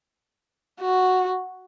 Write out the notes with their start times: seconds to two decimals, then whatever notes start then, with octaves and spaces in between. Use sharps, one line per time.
0.81 F#4